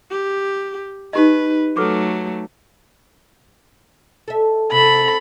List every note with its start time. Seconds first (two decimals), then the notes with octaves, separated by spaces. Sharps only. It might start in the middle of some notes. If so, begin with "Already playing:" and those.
0.11 G4
1.13 D#4 G4 B4 D#5
1.77 F#3 A3 A4 B4 D6
4.28 A4 E5
4.72 C3 A4 B5